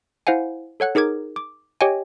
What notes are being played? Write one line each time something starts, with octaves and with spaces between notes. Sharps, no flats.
E4 C5 F5 F#5 G#5
A4 C#5 F#5 F#6
D#4 G#4 A#4 D6 G#6
D6
G4 C#5 D#5 G5 G#5